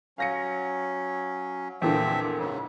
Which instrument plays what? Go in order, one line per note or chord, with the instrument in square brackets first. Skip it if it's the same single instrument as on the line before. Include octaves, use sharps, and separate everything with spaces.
[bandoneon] F#3 C#4 [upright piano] F5 A#6 C#7
[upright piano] E2 A#2 D3 [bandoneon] F3 C4 E5
[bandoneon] G#2 C#3